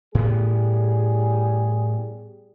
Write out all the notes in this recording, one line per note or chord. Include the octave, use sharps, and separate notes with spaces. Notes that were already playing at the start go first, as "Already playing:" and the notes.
A2 G3 B3 G#4